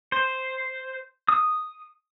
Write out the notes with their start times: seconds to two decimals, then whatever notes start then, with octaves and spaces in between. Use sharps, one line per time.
0.12 C5
1.29 D#6